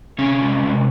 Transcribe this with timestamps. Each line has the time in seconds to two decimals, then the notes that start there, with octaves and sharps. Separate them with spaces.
0.18 C3 C#4
0.41 G#3
0.64 C3